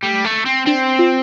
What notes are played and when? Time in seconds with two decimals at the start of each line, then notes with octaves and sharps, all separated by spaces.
0.03 G3 A3
0.25 A3
0.46 C4
0.66 C4 D4
0.99 F4